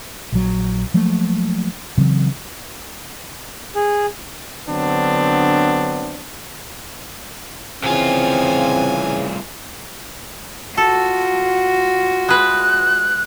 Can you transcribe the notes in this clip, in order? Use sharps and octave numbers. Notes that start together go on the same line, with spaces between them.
A#1 F#3
F3 F#3 A3 A#3
C#3 E3 F#3 C4
G#4
D3 F#3 B3 C4 D4
C2 C#3 E3 C4 F4 G#5
F4 F#4 A4
G#3 B4 F#6